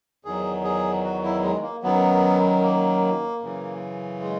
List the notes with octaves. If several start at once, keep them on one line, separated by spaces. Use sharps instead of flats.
E2 D#3 F#3 G#4
G#4
F#4
E4
G#3
A#3
F#2 D#3 F#3 B3
A#3
F#2 C#3 E3
G#3